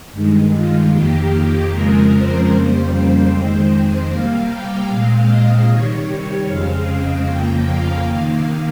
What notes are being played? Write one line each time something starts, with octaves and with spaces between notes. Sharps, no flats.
G2 D#3 G#3
F4
F2 D#3 A#3 G4
F2 C#3 F3 G#3 C4 A#4
C5
F2 C#3 G3 A#3 C5
C5
F2 D#3 G#3 C4 C5
C3 G3 A#3 F5
G5
A#2 G#3 C4 F5
D#5
C3 D#3 G3 C#5
F2 C#3 G#3 C4 F5
F2 C#3 F3 A#3 G5
F5
C3 D#3 A#3 F5